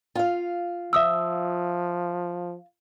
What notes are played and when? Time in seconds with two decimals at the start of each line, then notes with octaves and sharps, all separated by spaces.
0.15 F4 F5
0.93 F3 E5 D#6 E6